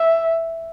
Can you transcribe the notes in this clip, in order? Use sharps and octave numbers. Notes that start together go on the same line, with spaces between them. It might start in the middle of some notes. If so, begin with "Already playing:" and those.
Already playing: E5